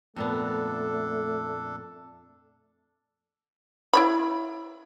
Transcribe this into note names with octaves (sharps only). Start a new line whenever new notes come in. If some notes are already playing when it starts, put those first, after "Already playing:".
F2 A#2 A3 B3 D4 A4
E4 C#5 B5